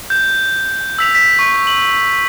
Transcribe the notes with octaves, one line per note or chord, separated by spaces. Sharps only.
G6
E6 B6 F7
B6
C#6
F#7